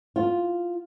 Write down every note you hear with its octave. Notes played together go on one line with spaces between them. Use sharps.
F4